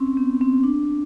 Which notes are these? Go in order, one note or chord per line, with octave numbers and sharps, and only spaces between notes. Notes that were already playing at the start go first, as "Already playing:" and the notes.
Already playing: C4 C#4
B3
C4
D4